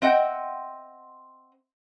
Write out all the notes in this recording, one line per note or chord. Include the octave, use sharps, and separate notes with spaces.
C4 D#5 E5 F#5 G5